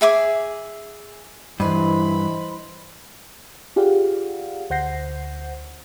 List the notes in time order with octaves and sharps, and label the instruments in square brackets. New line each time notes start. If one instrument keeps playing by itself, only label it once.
[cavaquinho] G#4 E5 G#5 D6
[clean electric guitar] G2 [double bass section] E3 [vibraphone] C5 D#5 C6 [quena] B5
[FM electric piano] F4 G4 G#4 D5 F5 F#5
D2 C5 F#5 G6 A#6 C7